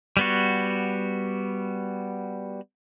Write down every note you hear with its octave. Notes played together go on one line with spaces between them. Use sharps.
G3 B3 F#4